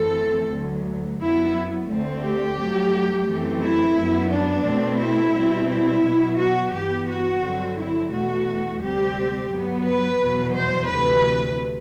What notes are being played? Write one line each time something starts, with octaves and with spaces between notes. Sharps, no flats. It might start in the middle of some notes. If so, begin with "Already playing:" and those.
Already playing: F#2 E3 A3 C4 A4
D2 D3 F#3
F#2 F#3 B3 E4
D2 D3 A3 C4
G4
G2 F#3 A3
F#2 E3 A3 C4
E4
F#2 F#3 B3
D4
B2 A3 C4
E4
B2 G3 C4
E4
B2 F#3 B3
F#4
G2 E3 B3 G4
F#4
G2 D3 F#3 C4
E4
E2 B2 A3 F#4
D2 C3 G3 C4 G4
G2 F#3 B3
B4
E2 B2 F#3 B3
C5
D2 C3 E3 B4